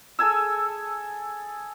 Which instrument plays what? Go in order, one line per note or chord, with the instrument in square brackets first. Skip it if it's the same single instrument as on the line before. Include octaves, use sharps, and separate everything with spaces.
[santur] G#4 A4 G#5 E6